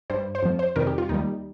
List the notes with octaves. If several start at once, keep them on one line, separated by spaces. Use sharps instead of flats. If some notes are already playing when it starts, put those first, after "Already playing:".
G2 G3 C5
C5
F2 F3
C5
F2 C3 D#3 G3 A#4
G4
F4
D#2 D#3 G3 D#4